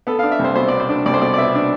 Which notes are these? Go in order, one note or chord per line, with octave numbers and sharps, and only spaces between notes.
B3 A4
F5
D4
E5
C2
C5
B2 C5
B3 D5
C5
D4
C2 D5
C5
B2 D5
D5
B3 E5
D4